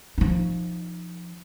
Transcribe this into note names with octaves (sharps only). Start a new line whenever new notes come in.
F3 D#4